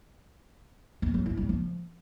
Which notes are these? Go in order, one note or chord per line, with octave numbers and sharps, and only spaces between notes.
F4
F#3
E4
G3
F3